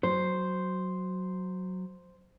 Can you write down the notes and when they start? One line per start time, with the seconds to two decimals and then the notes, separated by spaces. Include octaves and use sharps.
0.03 F#3 C5